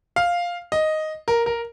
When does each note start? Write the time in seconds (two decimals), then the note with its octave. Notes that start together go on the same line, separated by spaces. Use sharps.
0.16 F5
0.72 D#5
1.28 A#4
1.46 A#4